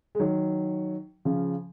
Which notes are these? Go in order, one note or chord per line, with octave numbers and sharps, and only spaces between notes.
G#3
D#3 F#3
C#3 F3